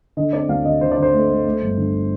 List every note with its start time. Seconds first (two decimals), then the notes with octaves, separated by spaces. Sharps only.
0.17 D3 D#5
0.33 C4 D5
0.48 D2 F5
0.65 D3 D#5
0.81 D3 C5
0.92 D5
0.97 D3
1.02 C5
1.14 A3
1.29 A3
1.46 A3
1.62 G1
1.77 D3